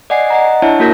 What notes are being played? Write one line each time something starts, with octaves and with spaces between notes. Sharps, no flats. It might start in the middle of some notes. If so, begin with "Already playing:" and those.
D5 D#5 F#5 G#5 C7
D#5 F#5 A#5
D4 E4 C#5 E5 A5
A#3 F#4 A#4 G6 A#6 B6